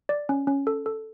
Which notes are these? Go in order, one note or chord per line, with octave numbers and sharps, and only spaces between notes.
D5
C#4
C#4
A4
A4